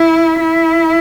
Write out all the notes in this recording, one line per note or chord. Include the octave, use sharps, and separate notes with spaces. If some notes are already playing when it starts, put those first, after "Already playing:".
Already playing: E4
E4